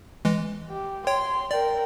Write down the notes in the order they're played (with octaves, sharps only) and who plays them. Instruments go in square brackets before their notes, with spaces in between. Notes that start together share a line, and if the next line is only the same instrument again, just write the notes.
[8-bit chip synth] E3 G#3
[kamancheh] G4
[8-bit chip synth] C#5 G5 [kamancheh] C6
[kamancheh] A#4 G5 [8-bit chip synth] D5